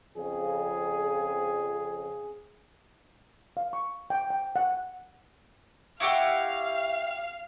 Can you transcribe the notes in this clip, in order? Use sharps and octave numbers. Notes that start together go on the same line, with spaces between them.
F2 C#3 G#4
F5
C#6
G5
G5
F#5
E4 F#4 G4 F5